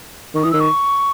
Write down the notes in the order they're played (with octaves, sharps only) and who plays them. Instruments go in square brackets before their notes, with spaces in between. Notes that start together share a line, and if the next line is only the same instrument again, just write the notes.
[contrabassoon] D#3 [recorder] C#6
[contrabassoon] E3 [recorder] D#6
[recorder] E6
[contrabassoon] D#3
[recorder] C#6